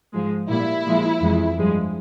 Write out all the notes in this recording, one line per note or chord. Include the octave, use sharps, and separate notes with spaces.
G#2 F3 G#3
A#2 G3 E4
A#2 F3 G#3
F2 E3 G#3
G2 F3 G#3